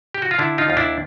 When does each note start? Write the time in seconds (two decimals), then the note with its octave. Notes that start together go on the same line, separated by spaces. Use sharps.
0.14 G4
0.22 F#4
0.31 F4
0.38 D3 D4 E4
0.58 D#4 F4
0.68 D#2 F4
0.77 D4 E4